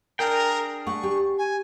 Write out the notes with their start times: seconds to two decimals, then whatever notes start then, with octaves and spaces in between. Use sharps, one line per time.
0.19 D4 G#4 A#4 G5
0.87 A3 F#5 C#6
1.03 G4
1.38 G#5